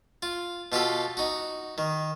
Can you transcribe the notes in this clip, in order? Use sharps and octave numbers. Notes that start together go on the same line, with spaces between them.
F4
B2 F4 G4 A4
D#4 F#4
D#3